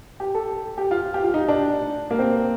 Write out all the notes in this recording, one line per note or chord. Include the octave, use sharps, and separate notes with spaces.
G4
A4
G4
F4
G4
F4
D#4
D4
A#3
C4